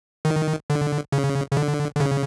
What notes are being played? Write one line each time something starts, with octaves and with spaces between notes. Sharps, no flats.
D#3
D3
C#3
C#3
D3
D3
C#3